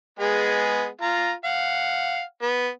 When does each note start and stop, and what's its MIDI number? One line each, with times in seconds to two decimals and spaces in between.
0.19 0.87 56
0.19 0.87 59
0.19 0.87 68
1.02 1.31 65
1.02 1.31 82
1.45 2.22 77
1.45 2.22 78
2.42 2.68 59